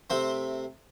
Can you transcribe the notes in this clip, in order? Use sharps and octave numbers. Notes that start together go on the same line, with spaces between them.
C3 A3 C4 C5